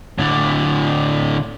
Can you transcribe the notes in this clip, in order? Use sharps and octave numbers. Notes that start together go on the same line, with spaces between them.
A2 D3